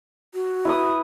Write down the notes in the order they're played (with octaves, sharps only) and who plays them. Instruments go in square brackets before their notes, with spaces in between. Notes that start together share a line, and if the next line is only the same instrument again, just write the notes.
[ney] F#4
[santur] E4 B4 D#6